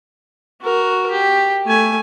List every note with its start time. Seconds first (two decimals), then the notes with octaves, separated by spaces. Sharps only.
0.61 F#4 A#4
1.11 G4
1.66 A3 G#5